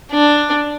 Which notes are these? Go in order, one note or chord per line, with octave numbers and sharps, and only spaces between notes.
D4